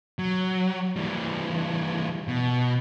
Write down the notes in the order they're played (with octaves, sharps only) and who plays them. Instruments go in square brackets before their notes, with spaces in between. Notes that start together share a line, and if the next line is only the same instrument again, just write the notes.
[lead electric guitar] F#3
E3 G3
B2